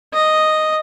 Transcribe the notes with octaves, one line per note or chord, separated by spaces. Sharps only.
D#5